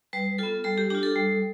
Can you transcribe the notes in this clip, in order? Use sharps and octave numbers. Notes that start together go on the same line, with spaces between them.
G3 B4
B3 F4 A4
G3 A4
G4
D4 F4 G4
A4
G3